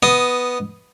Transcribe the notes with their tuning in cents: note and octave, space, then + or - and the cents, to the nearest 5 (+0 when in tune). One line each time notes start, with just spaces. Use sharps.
B3 +0 D#5 +0